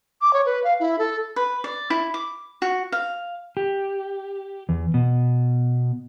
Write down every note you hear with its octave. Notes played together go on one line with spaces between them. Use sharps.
D6
C#5
B4
F5
E4
A4
B4
D5
E4
D6
F#4
F5
G4
E2
B2